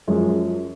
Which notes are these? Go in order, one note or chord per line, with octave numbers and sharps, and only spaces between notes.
F#2 F3 G#3